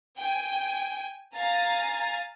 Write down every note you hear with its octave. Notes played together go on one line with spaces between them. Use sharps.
G5 G#5
F5 G#5 A#5 A6